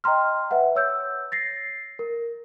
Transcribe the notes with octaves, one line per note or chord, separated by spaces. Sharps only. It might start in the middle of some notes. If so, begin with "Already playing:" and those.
D#5 G5 A#5 C6 F6
B4 E5 F#5
C#5 E6 G6
A6 A#6 C7
A#4